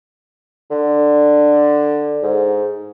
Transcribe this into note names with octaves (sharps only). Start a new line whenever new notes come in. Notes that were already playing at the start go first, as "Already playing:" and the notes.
D3
G#2